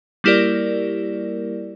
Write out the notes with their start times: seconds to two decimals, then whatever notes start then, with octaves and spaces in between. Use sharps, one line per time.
0.24 G3 A#3 E4 G4 A#4 D5